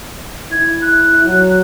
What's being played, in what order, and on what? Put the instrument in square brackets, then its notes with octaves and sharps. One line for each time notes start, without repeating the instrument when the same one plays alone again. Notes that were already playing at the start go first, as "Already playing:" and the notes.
[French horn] E4 [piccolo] G#6
[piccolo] F#6
[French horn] F#3